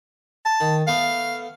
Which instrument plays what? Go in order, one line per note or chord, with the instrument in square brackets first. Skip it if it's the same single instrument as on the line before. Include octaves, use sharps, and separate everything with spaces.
[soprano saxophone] A5
[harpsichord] D#3
[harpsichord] A3 B3 [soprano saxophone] F5